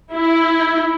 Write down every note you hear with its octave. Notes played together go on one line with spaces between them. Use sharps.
E4